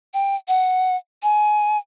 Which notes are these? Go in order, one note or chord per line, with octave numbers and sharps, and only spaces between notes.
G5
F#5
G#5